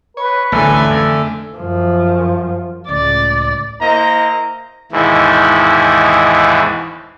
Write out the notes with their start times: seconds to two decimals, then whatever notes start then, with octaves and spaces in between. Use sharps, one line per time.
0.17 B4 C#5
0.52 A1 D2 G#2 D3 A3 A4 G#5
0.90 F2
1.57 F#2 F3
2.88 C#2 A2 D5
3.81 A#3 E4 C5 D#5 A#5
4.92 D#2 G#2 B2 E3